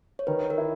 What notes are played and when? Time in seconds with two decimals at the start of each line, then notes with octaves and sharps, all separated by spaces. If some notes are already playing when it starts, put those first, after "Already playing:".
0.19 C#5
0.27 D#3 B4
0.50 A#4
0.58 E4